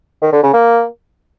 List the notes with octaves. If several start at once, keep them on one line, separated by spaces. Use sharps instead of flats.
D#3
D3
C#3
A#3